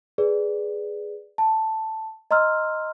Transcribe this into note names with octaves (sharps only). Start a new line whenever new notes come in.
G#4 B4 D5
A5
D#5 A#5 C6 E6 F6